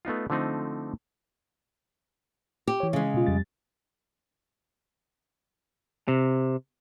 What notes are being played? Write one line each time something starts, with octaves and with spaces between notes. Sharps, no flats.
A3 B3 D#4 F4
D3 F3 A3 C4 D#4
G4
E3 C#5
C#3 G#3
B2 F4
F2 G3 A6
C3